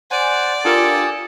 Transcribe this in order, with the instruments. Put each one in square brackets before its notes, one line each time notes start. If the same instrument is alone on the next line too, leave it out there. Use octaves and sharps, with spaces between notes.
[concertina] C5 F#5 [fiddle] D5 [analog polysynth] G#5
[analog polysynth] D4 F4 A#4 [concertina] G4 G#5 D#6 [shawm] A4